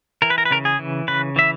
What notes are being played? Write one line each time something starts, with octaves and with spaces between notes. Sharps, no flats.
E3 A#4
B4
A#4
B4
C#3 A#4
G#4
E3
C#3 B4
E3 E5